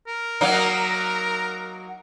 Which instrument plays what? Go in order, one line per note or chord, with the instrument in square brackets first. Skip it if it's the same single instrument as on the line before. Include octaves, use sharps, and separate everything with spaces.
[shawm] A#4
[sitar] F#3 A#3 D#4